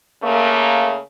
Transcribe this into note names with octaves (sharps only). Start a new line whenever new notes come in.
C#3 A3 A#3